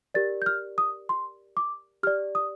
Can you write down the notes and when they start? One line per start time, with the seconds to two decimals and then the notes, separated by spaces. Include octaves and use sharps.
0.14 G4 A#4 D5 A6
0.42 G6
0.46 F6
0.78 D#6
1.09 C6
1.57 D6
2.03 G4 D5 F6
2.35 D#6